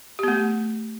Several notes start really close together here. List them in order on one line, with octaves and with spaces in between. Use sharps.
G4 B3 A3